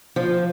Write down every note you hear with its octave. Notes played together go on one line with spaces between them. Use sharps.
F3